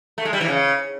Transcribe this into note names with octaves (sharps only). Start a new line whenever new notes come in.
A3
G#3
G3
E3
C#3